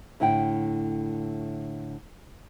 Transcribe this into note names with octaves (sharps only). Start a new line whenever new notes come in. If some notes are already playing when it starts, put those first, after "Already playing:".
A2 D3 E4 F#5 G5